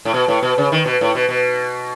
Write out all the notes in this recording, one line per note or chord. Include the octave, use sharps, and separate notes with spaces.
A2
B2
A2
B2
C#3
D#3
B2
A2
B2
B2